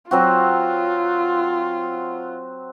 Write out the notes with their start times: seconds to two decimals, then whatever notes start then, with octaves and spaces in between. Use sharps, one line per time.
0.11 F#3 C4 F4 F#4